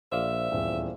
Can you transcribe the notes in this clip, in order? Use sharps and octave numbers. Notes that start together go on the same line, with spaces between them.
A#1 C5 D5 E5 F5
D#1 E2